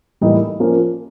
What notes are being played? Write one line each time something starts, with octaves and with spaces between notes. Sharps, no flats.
A2 E3 G3 A#3 D#4
F3 A#3 C#4